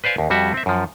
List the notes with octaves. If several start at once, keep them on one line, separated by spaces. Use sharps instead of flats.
B4 C5 D5 F5 G#5
D#2
F2 G3 F#4 E5
C4 E5
F#2 F3